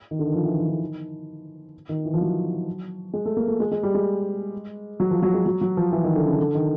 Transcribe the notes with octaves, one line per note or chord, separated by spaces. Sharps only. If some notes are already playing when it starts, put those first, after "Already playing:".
D#3
D3
D#3
F3
E3
D#3
D3
D#3
D#3
E3
F3
F#3
G#3
A3
A#3
A3
G#3
G#3
G3
G#3
F#3
F3
F#3
G#3
F#3
F#3
F3
E3
D#3
D3
C#3
D3
D#3